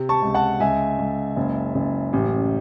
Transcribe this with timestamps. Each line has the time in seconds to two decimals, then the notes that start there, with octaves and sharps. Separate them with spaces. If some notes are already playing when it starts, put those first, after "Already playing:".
Already playing: C3
0.09 A5 C#6
0.22 C#2
0.34 F#5 A5
0.60 C#2 E5 G#5
0.98 C#2
1.36 F#1
1.75 F#1
2.13 A1